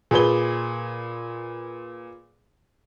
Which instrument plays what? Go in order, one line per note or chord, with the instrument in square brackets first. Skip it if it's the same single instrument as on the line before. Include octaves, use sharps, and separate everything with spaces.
[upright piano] A#2 G#4 B4 G7